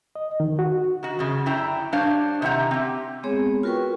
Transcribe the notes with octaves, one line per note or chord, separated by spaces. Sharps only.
D#5
D#3
F#4
D#3 F#4
F#2 C#3
F#2 D3 E4 G5 A#5
G3 D4 C5 C#5 F5
C3 D#3 E4 G4 F#5 A#5
C4 G4
G#3 B3 C4 G#4 C#5
F4 F#4 A#4 B4 G5 C#6